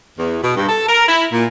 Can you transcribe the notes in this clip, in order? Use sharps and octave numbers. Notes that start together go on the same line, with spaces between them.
E2
B2
G2
A4
A#4
E4
A#2